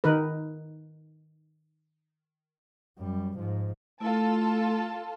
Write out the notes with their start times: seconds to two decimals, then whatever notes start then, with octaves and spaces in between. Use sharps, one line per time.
0.04 D#3 D#4 A#4 B4
2.98 F#2 G3
3.37 G#2 F3
4.00 A3 E4 F4 A4 A5